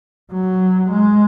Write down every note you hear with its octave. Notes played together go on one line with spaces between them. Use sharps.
F#3
G#3